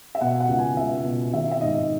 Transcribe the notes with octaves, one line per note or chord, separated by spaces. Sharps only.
E5
B2 F#5
F#5
C#2
G#5
C#2 E5
B2
D#3 E5
E5
G#2 D#5